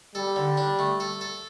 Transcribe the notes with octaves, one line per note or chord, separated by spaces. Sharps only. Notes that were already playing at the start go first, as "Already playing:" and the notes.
G3 A4
D3
D4
A3
A4
A4